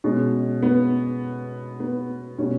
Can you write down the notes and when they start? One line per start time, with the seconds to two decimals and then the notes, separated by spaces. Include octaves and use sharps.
0.04 B2 G#3 C#4
0.63 B3
1.80 B3
2.38 B2 G3 C#4